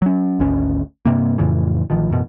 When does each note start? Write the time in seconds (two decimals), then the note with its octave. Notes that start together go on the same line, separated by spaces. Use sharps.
0.02 F#3 C#4
0.39 G#1 D2 C#4
1.05 G2 C3 A#3
1.38 F2 A2 C#3 E3
1.90 A1 D#3 F3
2.10 A1 F#2 B2